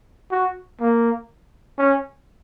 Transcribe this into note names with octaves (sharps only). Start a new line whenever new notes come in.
F#4
A#3
C#4